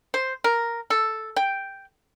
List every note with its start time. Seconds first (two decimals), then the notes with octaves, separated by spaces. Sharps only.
0.14 C5
0.44 A#4
0.90 A4
1.36 G5